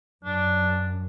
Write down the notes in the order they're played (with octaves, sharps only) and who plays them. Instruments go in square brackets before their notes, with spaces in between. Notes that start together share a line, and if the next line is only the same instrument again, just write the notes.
[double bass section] F#2 [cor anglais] D4